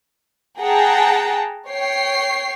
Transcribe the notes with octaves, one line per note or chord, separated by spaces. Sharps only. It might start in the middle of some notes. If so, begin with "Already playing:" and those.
G#4 F#5 G5 A5 A#5
C#5 G5 C7